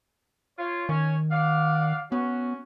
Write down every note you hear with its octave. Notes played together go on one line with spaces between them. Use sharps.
F4 C#5
D#3 C#4 C#5
D5 F5 F#5
B3 C#4 F#4